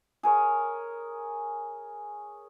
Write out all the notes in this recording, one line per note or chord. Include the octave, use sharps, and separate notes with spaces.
G#4 A#4 C#5